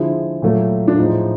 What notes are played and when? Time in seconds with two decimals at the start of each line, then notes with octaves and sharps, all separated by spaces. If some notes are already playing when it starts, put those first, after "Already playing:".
Already playing: D3 F3 G#3 E4
0.42 A#2 F#3 A3
0.88 D4
0.98 A2 F3 G#3 D#4